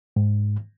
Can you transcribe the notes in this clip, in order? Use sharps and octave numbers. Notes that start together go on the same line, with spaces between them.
G#2